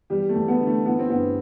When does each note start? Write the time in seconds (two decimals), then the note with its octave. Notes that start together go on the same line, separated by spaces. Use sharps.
0.10 E2 G3 G4
0.29 A3
0.35 E2
0.48 B3
0.60 D3
0.67 A3
0.85 E3 B3
0.99 C4
1.10 G2 B3